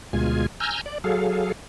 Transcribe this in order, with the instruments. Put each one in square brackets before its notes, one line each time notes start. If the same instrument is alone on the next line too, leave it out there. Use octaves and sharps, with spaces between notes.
[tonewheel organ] D2 B2 G#3 F4 G#5
G#5 A#5 E6 F6 G6
D5
F#3 G#4 A4 F5